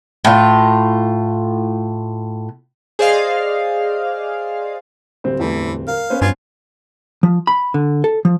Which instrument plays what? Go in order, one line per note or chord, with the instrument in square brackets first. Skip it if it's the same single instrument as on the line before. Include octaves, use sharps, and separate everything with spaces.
[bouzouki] A2 F4
[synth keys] G#4 C5 D5 D#5 F5
[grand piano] D1 G3 C4 [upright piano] C5
[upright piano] E2 A3 C5 [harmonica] E3
[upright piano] A#4 [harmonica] F5
[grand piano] B3 C#4 C5
[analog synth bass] G2 [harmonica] F4 G#5
[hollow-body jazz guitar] F3
B5
D3
A4
F3